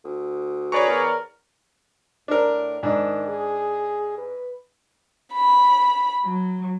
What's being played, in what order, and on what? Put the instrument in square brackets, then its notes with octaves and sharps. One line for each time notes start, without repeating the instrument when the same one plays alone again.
[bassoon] D2
[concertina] G#4 B4 A#5 [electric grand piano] C#5 D5 C#6
[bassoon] E2 [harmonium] A#4
[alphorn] A2 [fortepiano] D4 A#4
[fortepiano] G#2 D4 [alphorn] D#3
[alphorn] G#4
B4
[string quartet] B5
F#3